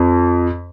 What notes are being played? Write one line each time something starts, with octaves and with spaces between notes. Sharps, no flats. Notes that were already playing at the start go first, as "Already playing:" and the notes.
Already playing: F2